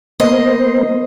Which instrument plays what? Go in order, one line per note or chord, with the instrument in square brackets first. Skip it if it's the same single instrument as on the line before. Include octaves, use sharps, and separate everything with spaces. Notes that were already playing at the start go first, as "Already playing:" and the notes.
[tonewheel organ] A#3 B3 C5 [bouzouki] D#5